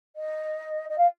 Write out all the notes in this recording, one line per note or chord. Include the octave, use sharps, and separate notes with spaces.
D#5
D#5
F5